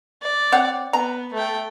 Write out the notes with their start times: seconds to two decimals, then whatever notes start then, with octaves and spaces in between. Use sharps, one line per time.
0.22 D5
0.52 C4 C#5 F#5
0.93 B3 A#5
1.34 A3 G5